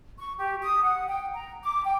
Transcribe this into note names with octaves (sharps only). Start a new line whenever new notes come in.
C#6
G4
D#6
F#5
G5
A#5
D6
G5